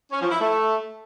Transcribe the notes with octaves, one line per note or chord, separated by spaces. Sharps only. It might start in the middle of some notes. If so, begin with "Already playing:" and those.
C#4
F3
E4
A3